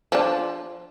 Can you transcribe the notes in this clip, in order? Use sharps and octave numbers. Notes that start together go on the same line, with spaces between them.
F3 D4